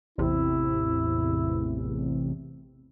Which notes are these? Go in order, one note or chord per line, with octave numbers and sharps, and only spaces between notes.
A1 E2 C3 E4